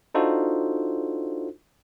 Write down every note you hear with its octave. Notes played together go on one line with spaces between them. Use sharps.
D4 D#4 F4 F#4 A4 C5